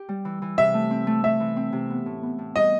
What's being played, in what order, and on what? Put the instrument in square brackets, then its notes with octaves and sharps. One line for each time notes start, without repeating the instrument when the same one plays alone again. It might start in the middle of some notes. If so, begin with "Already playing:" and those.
Already playing: [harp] G4
G3
E3
E3
[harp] C3 [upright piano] E5
[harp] A3
C4
A3
[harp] A3 [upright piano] E5
[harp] E3
C4
C3
B3
A2
B3
A2
[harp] G3 [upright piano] D#5